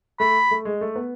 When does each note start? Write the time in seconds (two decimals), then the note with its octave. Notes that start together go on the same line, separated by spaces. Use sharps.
0.20 A3 B5
0.51 A3
0.65 G#3
0.81 A3
0.96 B3